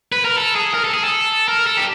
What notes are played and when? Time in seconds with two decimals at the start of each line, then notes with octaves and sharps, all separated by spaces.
0.12 B4
0.25 A#4
0.37 A4
0.55 G#4
0.74 A#4
0.84 A4
0.94 G#4
1.04 A4
1.48 A#4
1.67 A4
1.77 G4